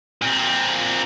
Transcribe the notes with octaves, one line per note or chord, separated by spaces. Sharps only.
A#2 C4